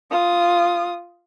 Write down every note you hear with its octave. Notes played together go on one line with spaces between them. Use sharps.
F4 D#6